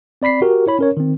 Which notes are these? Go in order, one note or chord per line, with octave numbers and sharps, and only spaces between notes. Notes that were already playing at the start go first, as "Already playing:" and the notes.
C4 D5 B5 B6 C7
F#4 G4 A#4
E4 C#5 B5
C#4 A#4 C#5
D#3 C4